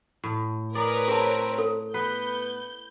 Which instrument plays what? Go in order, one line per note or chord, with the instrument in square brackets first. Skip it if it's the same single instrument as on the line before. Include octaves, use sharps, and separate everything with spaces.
[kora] A2
[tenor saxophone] G#4 [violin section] A#4 B4 C#5 [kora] D5
[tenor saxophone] C4 [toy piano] G#4 A5
[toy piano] A4
[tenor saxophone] B3 [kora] B4 [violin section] G6